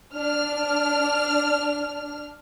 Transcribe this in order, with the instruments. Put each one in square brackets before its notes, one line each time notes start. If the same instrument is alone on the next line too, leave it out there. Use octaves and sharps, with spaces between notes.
[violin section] D4 F6